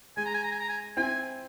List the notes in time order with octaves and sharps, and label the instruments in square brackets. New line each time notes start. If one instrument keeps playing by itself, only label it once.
[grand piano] G#3 [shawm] G#5
[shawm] A#5
G#5
A#5
G#5
A#5
G#5
[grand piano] C4 E4 [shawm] G#5